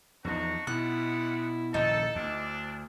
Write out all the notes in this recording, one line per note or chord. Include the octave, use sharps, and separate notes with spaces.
E2 F3 D4 D#4 F#4
B2 G3 G#3 E4 F#5 F#6
A#1 D#2 C#3 D#4 A4 A5
D2 C4 D4